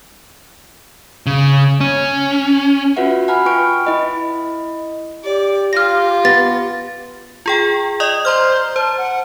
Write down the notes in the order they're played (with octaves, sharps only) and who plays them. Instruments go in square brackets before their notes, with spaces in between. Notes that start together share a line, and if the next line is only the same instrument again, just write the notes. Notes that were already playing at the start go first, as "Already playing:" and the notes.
[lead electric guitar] C#3
C#4
[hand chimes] F4 F#4 B4 E5 F#5
F#5 G#5 A#5 B5 F6
F4 B4 G5 C#6 F6 D7
E4 D#5 B5
[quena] G4 [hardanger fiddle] D5
[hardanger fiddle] F4 [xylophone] F6 A#6
[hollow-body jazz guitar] B3 [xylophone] A6 A#6
[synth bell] F4 G#4 G5
D5 D#5 D#6
[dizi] C5 [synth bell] A#5 C6 F6
[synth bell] C5 [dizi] A5
[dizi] F#5